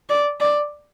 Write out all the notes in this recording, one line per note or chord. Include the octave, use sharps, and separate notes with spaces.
D5
D5